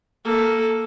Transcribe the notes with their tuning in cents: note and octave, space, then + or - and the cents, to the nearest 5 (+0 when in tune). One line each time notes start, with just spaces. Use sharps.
A#3 +0 A4 +0